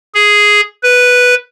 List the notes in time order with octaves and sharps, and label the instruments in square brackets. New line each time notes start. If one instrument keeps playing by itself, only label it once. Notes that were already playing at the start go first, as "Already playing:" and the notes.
[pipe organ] G#4
B4